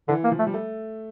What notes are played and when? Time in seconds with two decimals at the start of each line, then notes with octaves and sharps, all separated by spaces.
0.08 D3 E3
0.24 A#3
0.32 F3
0.39 A3
0.47 G3
0.54 A3